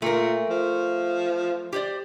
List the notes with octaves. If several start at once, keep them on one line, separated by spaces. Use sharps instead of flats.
A#2 A3 A#4
F3
G4 C5 D5